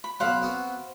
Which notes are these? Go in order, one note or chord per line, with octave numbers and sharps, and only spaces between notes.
B5
B1 C#3 C5 F5 F#5 B5
B3 C4 F#4